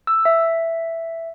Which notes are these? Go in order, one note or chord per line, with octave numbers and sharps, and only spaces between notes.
E6
E5